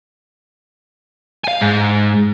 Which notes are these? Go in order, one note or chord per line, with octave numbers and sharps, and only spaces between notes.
F5 G#5
G#2